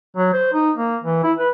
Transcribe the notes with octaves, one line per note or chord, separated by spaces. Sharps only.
F#3
C5
D#4
A#3
E3
E4
B4